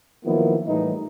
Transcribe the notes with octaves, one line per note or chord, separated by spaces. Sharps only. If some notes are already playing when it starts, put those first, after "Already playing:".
D#3 F3 F#3 A#3 B3 E4
A2 E3 G3 D#4